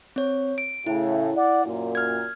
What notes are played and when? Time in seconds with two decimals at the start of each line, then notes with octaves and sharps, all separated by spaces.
0.16 C4 C#5
0.58 D7
0.87 A2 C#3 E4
1.36 D5 F#5
1.65 F#2 A#2
1.95 F6 G#6